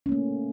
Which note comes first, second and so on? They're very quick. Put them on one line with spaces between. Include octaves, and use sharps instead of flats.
C#4 A#3 A3